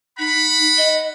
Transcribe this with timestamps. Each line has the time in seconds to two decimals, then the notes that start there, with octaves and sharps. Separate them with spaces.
0.18 D#4 F#5 B5
0.78 D#5